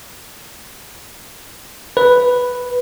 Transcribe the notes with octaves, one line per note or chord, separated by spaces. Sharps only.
B4